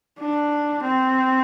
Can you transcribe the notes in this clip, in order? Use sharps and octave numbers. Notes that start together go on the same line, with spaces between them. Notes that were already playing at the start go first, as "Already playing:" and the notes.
D4
C4